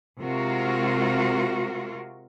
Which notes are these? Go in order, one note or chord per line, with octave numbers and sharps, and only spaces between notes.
C3 G#3 F4 F#4 A#4